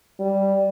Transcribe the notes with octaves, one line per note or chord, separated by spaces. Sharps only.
G3